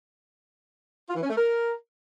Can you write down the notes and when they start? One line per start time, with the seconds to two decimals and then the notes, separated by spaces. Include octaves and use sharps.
1.08 F4
1.15 E3
1.22 C#4
1.29 A3
1.37 A#4